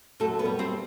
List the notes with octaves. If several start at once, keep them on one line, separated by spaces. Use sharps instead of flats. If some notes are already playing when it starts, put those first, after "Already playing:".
F#2 A3 A4
B3 B4
G3
C4 C5